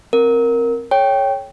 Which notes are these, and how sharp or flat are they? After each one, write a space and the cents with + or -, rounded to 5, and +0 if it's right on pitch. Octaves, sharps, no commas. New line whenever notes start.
C4 +10 A#4 +0
A4 -25 C#5 +0 G5 +0